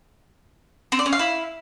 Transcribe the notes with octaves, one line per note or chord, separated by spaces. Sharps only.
C4
D5
C#4
F5
E4